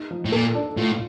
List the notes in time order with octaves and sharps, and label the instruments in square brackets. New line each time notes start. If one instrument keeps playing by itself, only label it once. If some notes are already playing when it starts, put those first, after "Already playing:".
Already playing: [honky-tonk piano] D#4
F3
[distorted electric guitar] A2
[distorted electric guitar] A#2 [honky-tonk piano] A4
[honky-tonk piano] D4
[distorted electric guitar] A2 [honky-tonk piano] F4